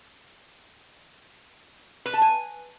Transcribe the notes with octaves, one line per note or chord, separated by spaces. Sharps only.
B4
A5
G#5